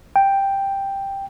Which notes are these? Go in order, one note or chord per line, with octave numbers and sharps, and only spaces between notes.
G5